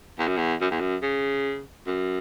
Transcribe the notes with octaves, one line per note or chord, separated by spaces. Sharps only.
E2
F#2
E2
F#2
E2
F#2
C#3
F#2